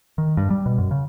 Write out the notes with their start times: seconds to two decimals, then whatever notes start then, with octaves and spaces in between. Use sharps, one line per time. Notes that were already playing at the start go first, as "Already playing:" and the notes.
0.18 D#3
0.37 G2
0.50 G3
0.66 B2
0.78 F#2
0.91 C#3